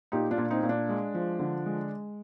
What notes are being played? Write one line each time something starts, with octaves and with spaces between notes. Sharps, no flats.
A#2 D#4 G4
D4 F4
A#2
C4 D#4
A#2
D4
G#3
F3
D3
G#3